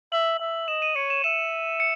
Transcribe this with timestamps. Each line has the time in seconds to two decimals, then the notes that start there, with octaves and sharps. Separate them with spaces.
0.12 E5 F#7
0.40 E5
0.68 D#5 E7
0.82 D#7
0.96 C#5 C#7
1.10 E7
1.24 E5 E7
1.80 C#7